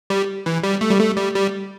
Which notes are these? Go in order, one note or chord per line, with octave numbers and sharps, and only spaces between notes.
G3
E3
G3
A3
G3
A3
G3
G3